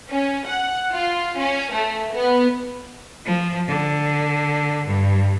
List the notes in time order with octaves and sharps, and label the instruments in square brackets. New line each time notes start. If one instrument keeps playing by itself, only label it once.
[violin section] C#4
F#5
F4
C#4
A3
B3
[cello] F3
D3
G2